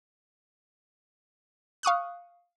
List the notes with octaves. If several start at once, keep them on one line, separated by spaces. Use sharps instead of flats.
F5 C#6 D#6 F#6